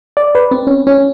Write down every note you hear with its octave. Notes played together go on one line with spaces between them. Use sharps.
D5
B4
C4
C#4
C#4